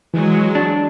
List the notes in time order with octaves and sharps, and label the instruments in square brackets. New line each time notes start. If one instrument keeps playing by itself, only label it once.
[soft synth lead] E3 [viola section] F#3 G#3
[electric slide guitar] D4